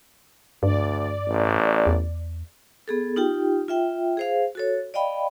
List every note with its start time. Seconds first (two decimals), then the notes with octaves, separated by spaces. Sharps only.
0.63 D2 G2 D5
1.27 A1
1.87 E2
2.88 B3 G#4 A4
3.16 D#4 F4 G4 G5
3.68 F4 E5 G5
4.17 G#4 C5 F5
4.55 F#4 A4 C#5
4.94 D5 D#5 F5 G5 B5